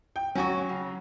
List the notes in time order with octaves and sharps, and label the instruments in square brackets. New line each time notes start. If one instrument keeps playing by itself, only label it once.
[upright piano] G5
[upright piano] F#3 C#6 [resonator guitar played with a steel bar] C#4 F#4
[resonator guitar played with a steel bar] C#3